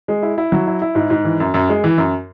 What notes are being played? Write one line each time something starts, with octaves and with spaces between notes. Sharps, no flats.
G#3
E4
E4
F#3
E4
E4
G#2
G#2
E3
F#2
F#2
G#3
E3
F#2